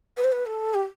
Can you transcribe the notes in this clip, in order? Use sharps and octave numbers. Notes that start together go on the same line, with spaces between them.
B4
C5
B4
A4
G4